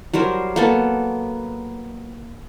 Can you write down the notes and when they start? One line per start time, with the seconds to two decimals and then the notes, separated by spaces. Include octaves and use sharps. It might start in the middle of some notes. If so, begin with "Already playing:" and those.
0.13 F#3 G3 A#4 C5
0.56 A#3 B3 A4